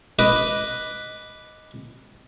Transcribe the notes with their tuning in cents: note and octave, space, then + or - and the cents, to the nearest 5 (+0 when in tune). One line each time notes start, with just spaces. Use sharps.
B4 +0 D#5 +0 D6 +0